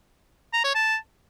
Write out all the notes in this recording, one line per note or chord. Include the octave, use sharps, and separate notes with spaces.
A#5
C#5
A5